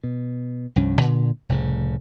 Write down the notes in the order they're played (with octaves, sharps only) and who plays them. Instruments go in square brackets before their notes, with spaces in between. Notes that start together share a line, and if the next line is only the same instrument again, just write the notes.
[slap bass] B2
C2 G2 F3 C#4
A#2 D3
F1 C2 A2 C#3